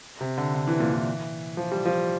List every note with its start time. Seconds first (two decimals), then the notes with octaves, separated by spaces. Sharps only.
0.21 C3
0.38 D3
0.55 D3
0.68 E3
0.80 A#2
0.94 E3
1.57 F3
1.72 G3
1.85 F3